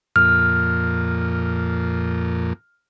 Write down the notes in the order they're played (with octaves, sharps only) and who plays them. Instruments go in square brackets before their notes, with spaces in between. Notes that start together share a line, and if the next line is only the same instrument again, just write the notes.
[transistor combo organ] F2 A#2 [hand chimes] F6